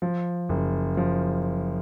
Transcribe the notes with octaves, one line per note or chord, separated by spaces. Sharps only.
F3
F#1
F3